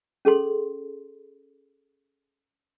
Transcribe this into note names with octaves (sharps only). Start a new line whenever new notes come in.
C#4 G#4 A4 C6